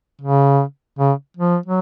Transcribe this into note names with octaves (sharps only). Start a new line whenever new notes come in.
C#3
C#3
F3
F#3